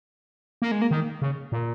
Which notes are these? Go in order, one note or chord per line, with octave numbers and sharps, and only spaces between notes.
A#3
G#3
A#3
D#3
C#3
A#2